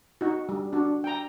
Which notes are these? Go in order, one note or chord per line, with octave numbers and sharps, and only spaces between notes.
D#4 F#4
G3
D4 F#4
G5 A#5